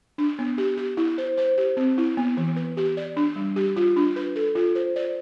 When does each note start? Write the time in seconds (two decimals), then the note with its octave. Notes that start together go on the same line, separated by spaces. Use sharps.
0.18 D4
0.39 B3
0.58 G4
0.77 G4
0.97 E4
1.18 C5
1.37 C5
1.57 G4
1.77 C4
1.98 E4
2.17 B3
2.37 E3
2.56 B4
2.77 G4
2.97 D5
3.17 D4
3.36 G3
3.56 G4
3.76 F4
3.96 D4
4.16 B4
4.36 A4
4.55 F4
4.75 C5
4.96 D5